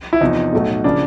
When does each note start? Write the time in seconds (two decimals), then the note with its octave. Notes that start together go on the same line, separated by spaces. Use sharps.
0.13 E4
0.21 E2 C3 F3 D#4
0.53 B1 A2 F#3 A3
0.84 C#3 F3 A#3 D4